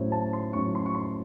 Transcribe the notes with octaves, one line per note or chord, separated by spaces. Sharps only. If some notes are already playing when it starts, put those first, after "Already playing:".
Already playing: A2 F#3 C#4 C5 C#5
A5
C6
A2 F#3 C#4 C#6
C6
C#6
C6